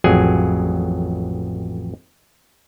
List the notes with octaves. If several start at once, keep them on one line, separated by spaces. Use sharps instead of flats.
A1 F2 F#3 G#4 G#5